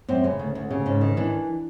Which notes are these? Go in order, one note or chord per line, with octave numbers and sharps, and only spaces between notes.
F#2 C4
C#3 C#4
D2
D2
C#3
G#2 C#4
D#3
E3 D4